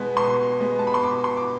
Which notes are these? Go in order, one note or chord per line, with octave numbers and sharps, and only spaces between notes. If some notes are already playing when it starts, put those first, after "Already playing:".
Already playing: B2 G#3 B3
B2 C6
G#3 B3
A5
B5
C6
B2 D6
C6
D6